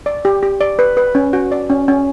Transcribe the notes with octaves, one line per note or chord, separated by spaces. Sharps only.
D5
G4
G4
D5
B4
B4
C#4
F#4
D5
C#4
C#4